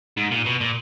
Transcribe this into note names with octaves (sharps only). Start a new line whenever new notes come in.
G#2
A#2
B2
A#2